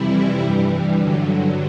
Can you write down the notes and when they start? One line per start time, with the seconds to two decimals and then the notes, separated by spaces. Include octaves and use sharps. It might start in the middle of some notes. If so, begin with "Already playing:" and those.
Already playing: F2 C3 E3 G3 E4
0.39 G2 E3 G3
0.98 G2 D3 F#3